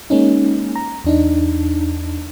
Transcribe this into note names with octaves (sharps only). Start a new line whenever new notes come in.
G#3 A#3 C#4 D#4
A#5
E2 D4 D#4